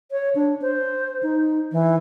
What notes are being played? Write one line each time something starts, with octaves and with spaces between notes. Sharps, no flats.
C#5
D4
C5
D#4
E3